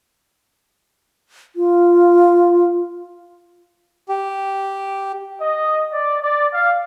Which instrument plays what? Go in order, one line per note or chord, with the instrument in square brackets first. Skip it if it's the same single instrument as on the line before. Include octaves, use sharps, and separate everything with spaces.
[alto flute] F4
[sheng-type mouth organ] G4
[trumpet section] D#5
D5
D5
F5